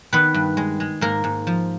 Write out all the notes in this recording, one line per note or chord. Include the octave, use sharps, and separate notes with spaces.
D#3 B3 B4
G2
G#3
G#3
G#2 A#3 A#4
G#2
F3